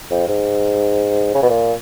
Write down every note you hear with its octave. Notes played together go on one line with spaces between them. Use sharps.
F2
G#2
C#3
B2
A#2